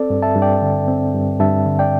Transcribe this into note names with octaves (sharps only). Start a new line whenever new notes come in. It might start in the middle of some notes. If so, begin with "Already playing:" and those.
Already playing: C4 A4 D5
G2
E5 A5
G2
D5 G5
D3
C4
G2
G2 E5 A5
D3
D5 G5